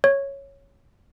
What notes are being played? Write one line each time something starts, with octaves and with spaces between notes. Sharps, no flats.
C#5